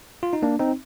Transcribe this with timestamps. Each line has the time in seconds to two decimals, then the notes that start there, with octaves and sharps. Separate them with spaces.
0.23 F4
0.33 D#4
0.42 A#3 D4
0.59 C4 D#4